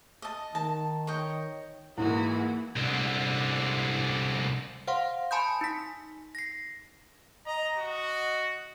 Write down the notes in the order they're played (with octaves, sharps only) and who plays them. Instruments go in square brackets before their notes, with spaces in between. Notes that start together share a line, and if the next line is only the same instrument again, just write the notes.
[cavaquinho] D#5 A5
[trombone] D#3 [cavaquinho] A5
[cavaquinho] C#5 D#5 G5
[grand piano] G#2 [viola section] E3 A#3 G#4 [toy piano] E4 [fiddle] F#4
[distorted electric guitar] C2 D3
[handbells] C5 F5 F#5 C6
G#5 A5 B5 C6 D#6 G6
D#4 B6
A#6 C7
[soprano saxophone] D#5 [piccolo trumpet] A#5
[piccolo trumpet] F#4